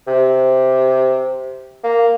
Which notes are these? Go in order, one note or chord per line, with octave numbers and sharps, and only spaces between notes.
C3
A#3